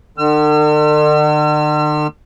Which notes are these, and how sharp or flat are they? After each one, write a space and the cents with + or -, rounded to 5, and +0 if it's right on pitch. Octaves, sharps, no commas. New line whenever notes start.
D3 +45 E6 +45